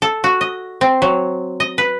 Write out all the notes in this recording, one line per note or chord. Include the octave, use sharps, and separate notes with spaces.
A4
F#4
D#5
C4
F#3
D#5
B4